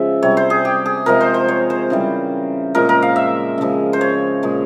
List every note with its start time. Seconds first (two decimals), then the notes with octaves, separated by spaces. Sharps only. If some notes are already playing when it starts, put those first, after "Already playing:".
Already playing: C#3 F3 G#3 E5
0.22 C3 G3 C#5
0.37 C5
0.50 G#4
0.65 G4
0.86 G#4
1.06 C3 F3 G#3 A#4
1.21 C5
1.34 C5
1.48 C#5
1.70 C5
1.90 C#3 E3 G3
2.75 A#2 F3 G#3 A#4
2.89 A#4
3.02 F5
3.16 E5
3.58 C#3 F3 G#3
3.93 C5
4.01 C#5
4.43 A#2 G#3